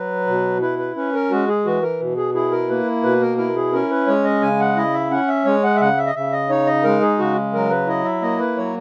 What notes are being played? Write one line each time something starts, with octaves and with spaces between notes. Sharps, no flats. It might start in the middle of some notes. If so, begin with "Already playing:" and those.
Already playing: F#3 B4
B2
E4 B4
B4
C#4 B4
A#4
G#3 F#4
G#4
E3 F#4
A#4
B2
G#4
E4 G#4
A#4
A#3 B4
B2 B4
A#4
E4 A#4
G#4
C#4 A#4
B4
G#3 C#5
D#5
C#3 G#5
F#5
E4 D#5
E5
C#4 F#5
E5
G#3 C#5
F#5
E5
C#3 F#5
E5
D#5
C#3 E5
D#5
D#4 C#5
D#5
G#3 A#4
G#4
C#3 F#4
F#3 A#4
B4
E4 D#5
E5
A#3 D#5
B4
F#3 C#5